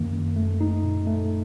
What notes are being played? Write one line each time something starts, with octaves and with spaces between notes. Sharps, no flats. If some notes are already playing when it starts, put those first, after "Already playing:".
Already playing: F#2 D#3 A#3
F#2
A3
D#4
A#2
A3